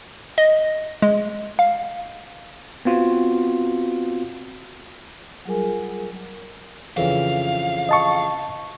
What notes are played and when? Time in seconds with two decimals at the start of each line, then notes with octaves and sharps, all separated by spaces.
0.38 D#5
1.02 G#3
1.59 F5
2.85 B3 C4 F4 F#4
5.45 F#3 G3 F4 G#4 A#4 G#5
6.97 F2 C#3 E3 F5
7.89 D#5 A5 C#6